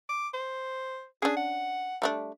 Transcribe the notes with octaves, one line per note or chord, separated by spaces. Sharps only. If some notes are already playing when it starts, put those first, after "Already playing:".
D6
C5
C#4 D4 G#4
F#5
G3 A3 D4